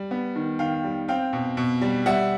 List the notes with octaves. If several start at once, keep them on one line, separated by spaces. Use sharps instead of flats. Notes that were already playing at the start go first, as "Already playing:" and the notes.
Already playing: G3
B3
D#3
D#3 F5 G5
G3
C4 F5 G5
B2
B2
G3
G3 E5 F#5